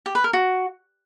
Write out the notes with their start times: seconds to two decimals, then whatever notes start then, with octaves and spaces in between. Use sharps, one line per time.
0.06 G4
0.15 B4
0.24 A#4
0.33 F#4